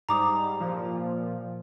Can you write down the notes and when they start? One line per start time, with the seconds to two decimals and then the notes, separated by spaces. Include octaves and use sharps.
0.09 G#2 G3 A#5 D6 D#6
0.60 A#2 F3